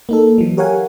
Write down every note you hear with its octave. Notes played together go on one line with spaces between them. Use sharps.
A#3 D#4 A4
E3 F#3
G4 A#4 C#5 F5 F#5 G#5